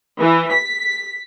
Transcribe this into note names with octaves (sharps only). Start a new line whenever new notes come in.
E3
B6